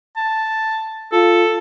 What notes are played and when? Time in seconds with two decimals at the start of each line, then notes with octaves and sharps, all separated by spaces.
0.17 A5
1.12 F4 A4